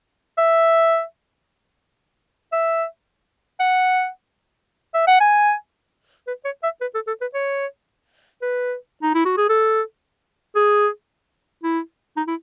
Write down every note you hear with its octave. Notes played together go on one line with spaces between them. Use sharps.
E5
E5
F#5
E5
F#5
G#5
B4
C#5
E5
B4
A4
A4
B4
C#5
B4
D#4
E4
F#4
G#4
A4
G#4
E4
D#4
E4